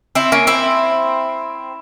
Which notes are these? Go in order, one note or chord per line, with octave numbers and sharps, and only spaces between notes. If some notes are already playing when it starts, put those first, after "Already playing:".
C4 E4
A#3 C#4
C4 E4